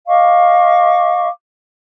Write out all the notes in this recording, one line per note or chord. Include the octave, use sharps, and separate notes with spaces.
D#5 F5 C#6 D6